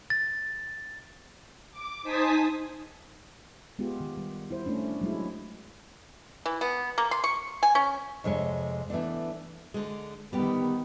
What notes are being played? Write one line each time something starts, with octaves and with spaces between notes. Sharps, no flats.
A6
D6
D#4 C5 G#5 A5 D#6 B6
G#3 B3 F4 G4
D#3
G3
E4 C5
A3 C#4 D4
F#3 G#3 E4
E3
B3
A#3
C6
C#6
G#5
C#4
F2 C3 G#3 C#5
E3 A3 B3 D4
D3 G#3
D#3 G3 B3 G4